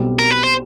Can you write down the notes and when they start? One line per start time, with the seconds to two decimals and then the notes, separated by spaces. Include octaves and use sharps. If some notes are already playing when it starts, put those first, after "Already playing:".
Already playing: B1 B2 G3 C4
0.19 A#4
0.31 B4
0.44 C5